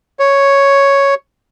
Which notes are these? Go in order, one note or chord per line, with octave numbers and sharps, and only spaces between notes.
C#5